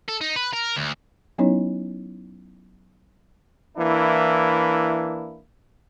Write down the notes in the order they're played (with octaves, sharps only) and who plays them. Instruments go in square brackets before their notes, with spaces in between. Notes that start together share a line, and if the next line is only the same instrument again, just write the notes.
[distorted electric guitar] A4
D#4
B4
A#4
D2
[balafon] F#3 B3 C#4 D#4 E4 C#5
[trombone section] E3 A#3 D4 E4